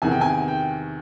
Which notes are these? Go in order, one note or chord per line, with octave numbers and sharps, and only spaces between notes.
E2 C3 D#3 G#5
G5
G#5
G5